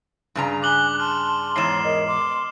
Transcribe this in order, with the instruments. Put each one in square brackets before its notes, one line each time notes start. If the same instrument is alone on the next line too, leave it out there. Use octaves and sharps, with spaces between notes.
[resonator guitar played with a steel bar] G2 C#3 A#5
[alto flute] G#5 [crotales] D6 F#7 G7 [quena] F#6
[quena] A5 [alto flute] C6 [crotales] F6
[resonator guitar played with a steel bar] E2 G#2 [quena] C#5 [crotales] C7 E7
[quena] A#4 [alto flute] D#5
[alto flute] C6 [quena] D6